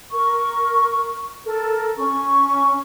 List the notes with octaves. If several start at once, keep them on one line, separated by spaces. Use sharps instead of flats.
A#4 C#6
A4 A#4
C#4 C#6